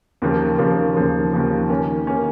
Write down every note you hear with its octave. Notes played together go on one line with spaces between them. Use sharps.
D#2 C#3 F3 A#3
D#2 C#3 F3 A#3
D#2 C#3 F3 A#3
D#2 C#3 F3 A#3
D#3 A#3 C#4
D#3 A#3 C#4